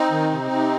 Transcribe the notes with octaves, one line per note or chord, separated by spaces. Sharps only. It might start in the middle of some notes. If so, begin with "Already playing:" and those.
Already playing: C4 D#4
D#3
C3
C3